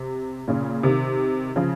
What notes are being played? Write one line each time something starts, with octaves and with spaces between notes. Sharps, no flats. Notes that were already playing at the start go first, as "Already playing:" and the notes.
Already playing: C3
A#2 C#3
C3 D#3
C#3 F3